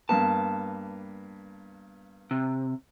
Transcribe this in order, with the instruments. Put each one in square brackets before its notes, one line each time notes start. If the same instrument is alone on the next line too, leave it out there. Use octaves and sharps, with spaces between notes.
[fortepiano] G2 A#3 B3 [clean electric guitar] A5
[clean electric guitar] C3